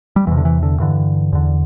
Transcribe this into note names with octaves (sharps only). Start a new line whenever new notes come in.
G3
E2 C3 E3
D3
E3
D3
G2 D3 E3
E2 D3